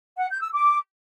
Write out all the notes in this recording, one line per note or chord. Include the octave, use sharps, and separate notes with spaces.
F#5
G6
E6
D6